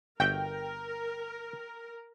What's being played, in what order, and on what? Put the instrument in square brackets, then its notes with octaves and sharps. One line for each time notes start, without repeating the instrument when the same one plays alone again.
[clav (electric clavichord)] G1 F#4 E5 [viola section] A#4 [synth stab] G5